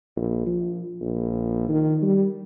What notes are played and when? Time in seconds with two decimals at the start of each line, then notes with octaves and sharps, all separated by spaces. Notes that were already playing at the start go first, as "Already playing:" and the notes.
0.16 A#1
0.46 F3
1.01 A#1
1.68 D#3
2.02 G3